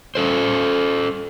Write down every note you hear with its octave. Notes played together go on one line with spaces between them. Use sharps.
C#4 A4 C5